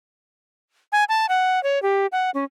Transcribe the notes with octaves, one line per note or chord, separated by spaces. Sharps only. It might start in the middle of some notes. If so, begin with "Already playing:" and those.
G#5
A5
F#5
C#5
G4
F#5
C#4